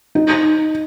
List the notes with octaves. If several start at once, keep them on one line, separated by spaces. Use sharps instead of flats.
D#4